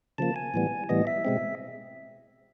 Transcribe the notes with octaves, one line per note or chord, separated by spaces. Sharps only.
C#3 F3 A#3 A5
G#5
A2 E3 G3 B3
A2 E3 G3 B3 D#5
E5
B2 G#3 C4